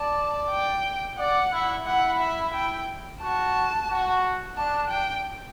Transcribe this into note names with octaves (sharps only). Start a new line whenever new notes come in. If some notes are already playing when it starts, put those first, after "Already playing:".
Already playing: D5 A5
G5
D5 F#5
E4
E4 F#5
E5
G5
F#4 A5
F#4
D4 A5
G5